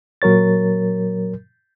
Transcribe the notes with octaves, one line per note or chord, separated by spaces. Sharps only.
A#2 F#3 A#4 C#5 A6